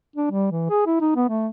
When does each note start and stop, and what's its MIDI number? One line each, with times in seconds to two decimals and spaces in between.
0.16 0.29 62
0.31 0.51 55
0.51 0.67 52
0.70 0.82 68
0.87 0.98 64
1.00 1.13 63
1.16 1.26 59
1.29 1.48 57